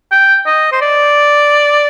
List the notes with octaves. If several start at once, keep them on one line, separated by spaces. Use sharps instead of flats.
G5
D#5
C5
D5